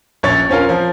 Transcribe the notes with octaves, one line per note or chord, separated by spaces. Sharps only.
A#1 C#4 C#5 A6
C4 C#4 F4 A#4
F3